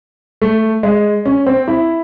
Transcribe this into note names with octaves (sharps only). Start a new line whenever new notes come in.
A3
G#3
C#4
C4
E4